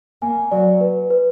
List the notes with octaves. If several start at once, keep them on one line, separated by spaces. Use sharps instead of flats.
A#3 G#5
F#3 D5
B4
B4